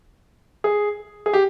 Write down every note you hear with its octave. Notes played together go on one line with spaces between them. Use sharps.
G#4
G#4
G4